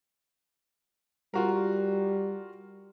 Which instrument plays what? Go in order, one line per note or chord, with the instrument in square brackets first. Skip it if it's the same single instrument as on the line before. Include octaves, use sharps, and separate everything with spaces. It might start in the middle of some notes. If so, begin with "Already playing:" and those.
[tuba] G3 [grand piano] F4 F#4 A#4